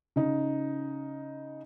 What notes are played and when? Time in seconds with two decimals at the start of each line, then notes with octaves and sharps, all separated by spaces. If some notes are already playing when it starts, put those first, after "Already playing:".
0.16 C#3 D#4